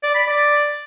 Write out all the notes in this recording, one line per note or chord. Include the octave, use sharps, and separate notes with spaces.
D5
B5
D5